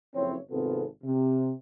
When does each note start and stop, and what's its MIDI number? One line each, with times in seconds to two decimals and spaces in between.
0.14 0.36 30
0.14 0.36 41
0.14 0.36 60
0.14 0.36 64
0.14 0.36 73
0.50 0.83 32
0.50 0.83 48
0.50 0.83 59
0.50 0.83 65
0.50 0.83 69
1.03 1.51 48